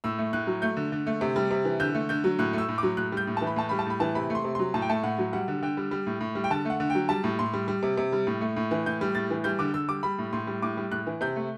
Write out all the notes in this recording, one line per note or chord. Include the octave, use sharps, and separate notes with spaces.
A2 E6
A3
A2 F#6
F#3
A3 G6
D3
D3
A3
C3
G3
C3
E3
D3 G6
A3
D3 G6
F#3
A2 F#6
A3 E6
A2
D6
F#3
A2 F#6
G3 G6
A2
E3 A5
B5
A2 A5
G3 B5
A5
A2 B5
E3 A5
C3 B5
A3
C6
C3
F#3 C6
A2 A5
G5
A3 A5
A2 F#5
F#3
G3 F#5
D3
D3 G5
G3
G3
A2
A2
G3
G5
D3 A5
A3 F#5
D3
F#3 G5
G3 A5
A2
A2 C6
G3
G3
C3
C3
G3
A2
A3
A2
E3
A2 G6
G3
A2 A6
E3
G3 G6
D3 D6
D3 E6
G3 D6
G3 B5
A2
A2 C6
G3
A2 D6
G3
A2 F#6
E3
C3 G6
A3